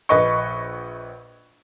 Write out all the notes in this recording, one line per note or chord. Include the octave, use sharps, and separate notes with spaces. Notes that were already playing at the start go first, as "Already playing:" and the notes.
A#1 B4 D#5 C#6